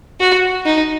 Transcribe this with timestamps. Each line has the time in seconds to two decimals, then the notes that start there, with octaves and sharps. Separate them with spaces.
0.20 F#4
0.65 D#4